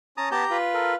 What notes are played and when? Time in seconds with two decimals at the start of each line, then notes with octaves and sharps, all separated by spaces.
0.17 C#4 A5 A#5 D#6
0.31 B3 G4 A5 A#5 G6
0.50 F4 B4
0.74 A4 A#4